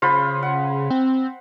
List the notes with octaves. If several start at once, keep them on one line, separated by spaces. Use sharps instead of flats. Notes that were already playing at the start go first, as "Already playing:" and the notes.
C#3 F4 C5 B5
F#5
C4